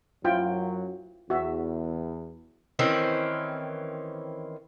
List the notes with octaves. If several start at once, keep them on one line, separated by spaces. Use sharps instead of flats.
F#2 F#3 E4 F4 G5
E2 F#4 E5
D#3 E3 C4 C#4